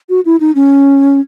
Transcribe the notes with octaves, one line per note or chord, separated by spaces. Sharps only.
F#4
E4
D#4
C#4